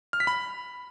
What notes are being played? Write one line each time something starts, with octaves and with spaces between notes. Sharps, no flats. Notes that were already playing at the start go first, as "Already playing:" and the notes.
F6
B6
B5